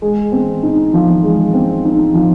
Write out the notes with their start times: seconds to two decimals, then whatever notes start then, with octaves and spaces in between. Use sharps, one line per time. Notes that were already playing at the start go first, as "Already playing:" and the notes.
0.02 G#3
0.32 C4
0.63 D#4
0.94 F3
1.23 G#3
1.53 C4
1.85 D#4
2.14 F3